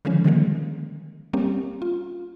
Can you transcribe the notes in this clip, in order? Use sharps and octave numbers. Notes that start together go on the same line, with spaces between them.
D3 D#3 F3 G#3 C#4
D3 D#3 F3 G3 G#3 A#3
G3 A#3 C4 C#4 G4
F4